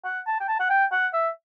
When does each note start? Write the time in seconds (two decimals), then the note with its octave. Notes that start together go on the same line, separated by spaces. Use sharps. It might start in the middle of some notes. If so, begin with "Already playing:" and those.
0.04 F#5
0.27 A5
0.40 G5
0.48 A5
0.60 F#5
0.70 G5
0.92 F#5
1.13 E5